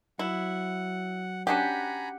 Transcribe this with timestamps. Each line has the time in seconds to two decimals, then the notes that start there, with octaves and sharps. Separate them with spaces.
0.19 F#3 E4 F#5
1.47 C#4 D4 G4 F#5 G#5 A#5 B5